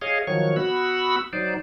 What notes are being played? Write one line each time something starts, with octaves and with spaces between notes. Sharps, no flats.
G#4 C#5 D#5 F5
D#3 F3 F#3 C#5 C#6
B3 F#4 F#5 B5 E6
F#3 D#4 C5 D5